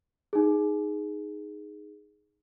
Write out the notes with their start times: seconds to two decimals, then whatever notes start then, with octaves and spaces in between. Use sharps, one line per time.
0.33 D#4 G#4